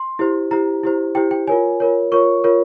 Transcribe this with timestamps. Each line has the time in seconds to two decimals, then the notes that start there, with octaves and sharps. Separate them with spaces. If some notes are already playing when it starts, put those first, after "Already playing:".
Already playing: C6
0.19 E4 G4 C5
0.51 E4 G4 C5 A#5
0.84 E4 G4 C5
1.15 E4 G4 C5 G5
1.31 G5
1.47 F4 A#4 C#5 G#5
1.80 F4 A#4 C#5
2.12 F4 A#4 C#5 C#6
2.44 F4 A#4 C#5